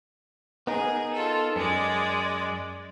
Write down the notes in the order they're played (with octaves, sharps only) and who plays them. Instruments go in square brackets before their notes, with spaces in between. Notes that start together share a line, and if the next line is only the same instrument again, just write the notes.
[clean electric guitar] B3 D#4 A#4 [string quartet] G#4
[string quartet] F4 A4
[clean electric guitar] F#2 [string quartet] G#3 D5